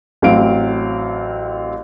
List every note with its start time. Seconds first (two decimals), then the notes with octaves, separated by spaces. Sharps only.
0.22 A1 F#3 C4 F5 D7